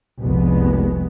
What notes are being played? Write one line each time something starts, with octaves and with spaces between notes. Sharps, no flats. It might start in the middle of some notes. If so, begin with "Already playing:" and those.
F1 C2 G#3 B3